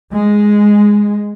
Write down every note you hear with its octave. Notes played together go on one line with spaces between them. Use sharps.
G#3